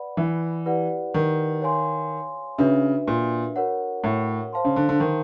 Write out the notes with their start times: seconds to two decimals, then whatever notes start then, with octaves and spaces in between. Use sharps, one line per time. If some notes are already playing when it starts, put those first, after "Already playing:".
Already playing: B4 D5 F#5 B5
0.17 E3
0.66 E4 G4 B4 D5 F#5
1.14 D#3
1.62 C#5 F5 G#5 C6
2.58 C#3 D4 F#4 B4 E5
3.08 A#2
3.56 F#4 A#4 C#5 F#5
4.04 A2
4.53 C5 F5 A5 C6
4.65 C#3
4.76 D3
4.89 D3
5.00 D#3